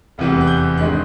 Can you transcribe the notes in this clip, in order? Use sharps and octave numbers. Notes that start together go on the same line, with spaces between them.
F1 E2 C3 E3 G3
F#6
G6
G#1 G2 D#3 G#3 F#6